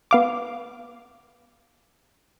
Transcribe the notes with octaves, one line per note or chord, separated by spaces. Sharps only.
B3 F5 D6